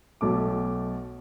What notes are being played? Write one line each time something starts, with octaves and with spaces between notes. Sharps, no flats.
B1 B2 A3 D6